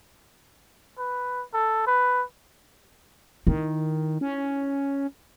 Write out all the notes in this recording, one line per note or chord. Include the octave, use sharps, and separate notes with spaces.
B4
A4
B4
D#3 D#4 E4
C#4